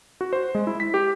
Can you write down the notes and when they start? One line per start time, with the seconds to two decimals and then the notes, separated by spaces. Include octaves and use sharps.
0.21 F#4
0.33 C5
0.55 G#3
0.67 E4
0.80 B6
0.94 G4